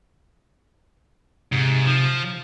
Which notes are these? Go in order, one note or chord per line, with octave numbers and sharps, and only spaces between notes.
G#2 C3
F3